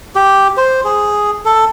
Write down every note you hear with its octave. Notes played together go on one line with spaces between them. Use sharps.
G4
C5
G#4
A4